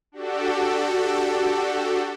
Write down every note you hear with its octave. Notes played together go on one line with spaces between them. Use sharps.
D4 F#4 G4 A4